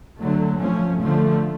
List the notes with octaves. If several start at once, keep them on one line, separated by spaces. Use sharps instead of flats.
D3 F#3 A3
F3 A3 C#4
D3 F3 A3